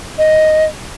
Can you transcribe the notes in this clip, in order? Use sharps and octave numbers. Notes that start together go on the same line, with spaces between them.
D#5